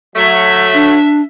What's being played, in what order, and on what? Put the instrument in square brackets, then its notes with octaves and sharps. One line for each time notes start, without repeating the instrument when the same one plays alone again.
[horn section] F#3 A3 [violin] E5
[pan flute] D4